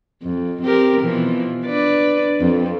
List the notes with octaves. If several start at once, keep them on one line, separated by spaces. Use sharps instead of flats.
F2
C4 G4 A#4
B2 E3 F3
D4 B4 D5
F2